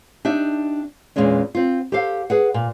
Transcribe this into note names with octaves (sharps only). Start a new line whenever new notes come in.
D4 D#4 G4 E5
E2 A#2 G#3 C#4 D4
C4 F4
G4 A4 C5 F5
G#4 B4 F#5
A#2